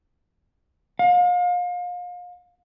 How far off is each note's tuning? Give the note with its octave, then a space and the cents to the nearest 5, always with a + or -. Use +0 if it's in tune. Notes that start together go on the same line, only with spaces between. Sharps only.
F5 +35